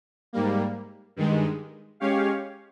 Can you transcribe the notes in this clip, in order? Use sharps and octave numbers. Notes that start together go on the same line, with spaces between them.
G#2 G3 A#3
G2 D#3 G#3
G#3 C#4 G4 C#5 F5